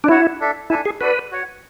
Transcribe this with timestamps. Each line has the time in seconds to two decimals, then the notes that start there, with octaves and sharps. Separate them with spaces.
0.04 D4
0.08 E4 F#4 C#5 F#5
0.40 D4 A4 E5
0.70 D4 E4 A4 E5 G#5
0.85 G#4
1.01 D4 F#4 A4 B4 D5
1.31 F#4 C#5 F#5